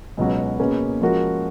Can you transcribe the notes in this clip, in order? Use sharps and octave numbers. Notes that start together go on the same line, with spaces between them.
C#2 B2 F#3 C#4 F#4
B2 A#3 C#4 G#4 B4
F3 G#3 C#4 F#4 A#4